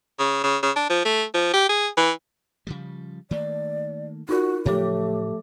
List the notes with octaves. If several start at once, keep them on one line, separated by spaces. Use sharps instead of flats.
C#3
C#3
C#3
D4
F3
A3
F3
G4
G#4
E3
C#3 F3 G3
D#3 A3 A#3 D5
D#4 F4 F#4 A#4
A2 C#3 F3 F#3 A3 G4 C#5 D6